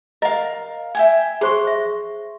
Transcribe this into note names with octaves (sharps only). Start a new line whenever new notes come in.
A#4 D#5 F5
E5 G5 G#5
G#4 C5 C6 C#6
E5